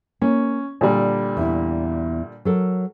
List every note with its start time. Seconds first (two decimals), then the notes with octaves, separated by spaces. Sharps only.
0.22 A#3 C#4
0.81 A#2 D3 G3 A5
1.37 E2 E4
2.45 F#3 A4 A#4